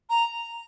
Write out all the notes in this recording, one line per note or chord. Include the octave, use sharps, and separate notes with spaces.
A#5